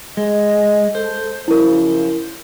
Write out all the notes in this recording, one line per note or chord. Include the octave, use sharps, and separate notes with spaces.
G#3 D#5
A4 C5
F#2 C#3 F3 E4 A#4